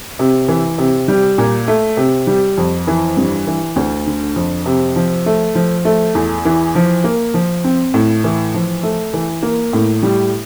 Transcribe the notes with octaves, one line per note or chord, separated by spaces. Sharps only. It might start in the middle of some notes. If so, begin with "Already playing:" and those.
C3
E3
C3
G3
A#2
A3
C3
G3
F2
E3
G2
E3
D2
D3
F2
C3
F3
A3
F3
A3
E2
E3
F3
A#3
F3
C4
A2
E3
F3
A3
E3
A#3
A2
G3